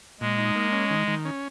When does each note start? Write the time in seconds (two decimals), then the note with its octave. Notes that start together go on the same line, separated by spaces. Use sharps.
0.20 A#2 G#3
0.38 D#4
0.55 A#3
0.72 C#4
0.90 D#3
1.08 D#3
1.25 C#4